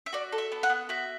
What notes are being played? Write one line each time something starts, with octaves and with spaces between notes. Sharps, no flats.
E5
F#4 D5
A4
E5
B3
F#5
B3
F#4 E5